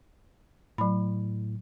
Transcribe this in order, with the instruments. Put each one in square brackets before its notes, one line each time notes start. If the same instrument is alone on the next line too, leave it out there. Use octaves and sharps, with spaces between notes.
[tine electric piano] A2 [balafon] F#3 B5